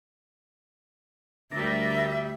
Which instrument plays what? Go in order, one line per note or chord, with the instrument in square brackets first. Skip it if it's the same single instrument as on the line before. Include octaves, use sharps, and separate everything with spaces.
[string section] D2 G3 [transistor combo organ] D4 A#4 [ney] E5